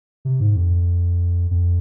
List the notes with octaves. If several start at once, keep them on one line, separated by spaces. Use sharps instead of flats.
C3
G#2
F2
F2